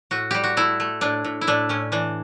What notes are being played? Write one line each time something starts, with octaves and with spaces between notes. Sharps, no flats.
A2 F#4
G3 G4
F#4
A3 E4
A3
A2 D4
A2
E4
A2 D4
A2 C#4
E3 D4